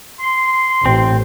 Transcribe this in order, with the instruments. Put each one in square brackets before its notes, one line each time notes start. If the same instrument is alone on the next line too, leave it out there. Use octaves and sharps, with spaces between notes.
[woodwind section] C6
[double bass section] A1 [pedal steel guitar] C4